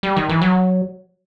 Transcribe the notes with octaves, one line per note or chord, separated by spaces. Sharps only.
G3
D#3
E3
F#3